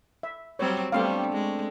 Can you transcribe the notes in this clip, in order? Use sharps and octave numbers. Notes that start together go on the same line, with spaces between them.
E5
F#3 G3 C4 C#5
G3 A3 B3 C4 D4 F5
G#3